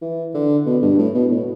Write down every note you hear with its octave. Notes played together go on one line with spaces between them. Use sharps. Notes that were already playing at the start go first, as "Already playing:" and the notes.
E3
D3
B2
G2
A2
B2
A2